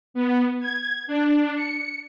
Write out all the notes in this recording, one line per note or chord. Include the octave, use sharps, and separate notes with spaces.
B3
G#6
D4
C#7